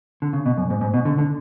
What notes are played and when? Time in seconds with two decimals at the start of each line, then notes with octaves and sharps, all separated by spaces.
0.22 D3
0.33 C#3
0.46 B2
0.57 F#2
0.70 G#2
0.81 G#2
0.94 B2
1.05 D3
1.18 D3